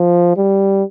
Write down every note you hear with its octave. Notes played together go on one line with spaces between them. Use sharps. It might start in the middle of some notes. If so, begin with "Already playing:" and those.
Already playing: F3
G3